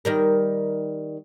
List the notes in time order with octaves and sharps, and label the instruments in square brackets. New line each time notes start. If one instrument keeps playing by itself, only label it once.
[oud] D#3 G3 A#4